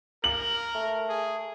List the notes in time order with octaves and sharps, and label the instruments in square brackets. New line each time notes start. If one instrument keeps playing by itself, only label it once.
[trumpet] A#4 [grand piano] F#7
[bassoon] A3
[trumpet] G#4